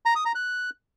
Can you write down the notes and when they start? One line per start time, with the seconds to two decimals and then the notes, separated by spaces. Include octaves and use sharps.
0.06 A#5
0.15 D#6
0.25 A#5
0.35 F#6